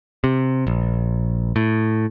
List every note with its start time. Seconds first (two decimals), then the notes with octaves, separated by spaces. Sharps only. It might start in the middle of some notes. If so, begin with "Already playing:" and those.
0.24 C3
0.67 A#1
1.56 A2